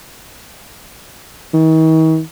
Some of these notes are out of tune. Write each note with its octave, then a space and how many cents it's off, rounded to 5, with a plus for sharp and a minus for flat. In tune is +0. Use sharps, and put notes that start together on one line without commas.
D#3 +45